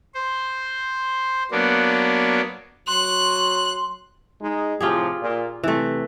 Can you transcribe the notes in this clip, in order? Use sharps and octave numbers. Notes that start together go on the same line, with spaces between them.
C5
F#3 A#3 B3 D4
F#3 C6 F#6
G#3 D#4
A2 C3 F3 F4 G4 G#4
A#2
C3 E3 A3